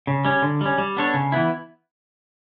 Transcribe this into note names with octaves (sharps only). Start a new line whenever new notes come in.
C#3
G3 C#4
D3
G3 C#4
G3
B3 D4 A4 C#5
C#3
E3 B3 E4